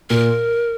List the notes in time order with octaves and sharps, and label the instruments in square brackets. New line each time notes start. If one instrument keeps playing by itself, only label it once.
[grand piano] A#2 [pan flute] A#4